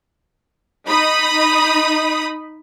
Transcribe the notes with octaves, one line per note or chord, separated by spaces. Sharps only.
D#4 B5 D#6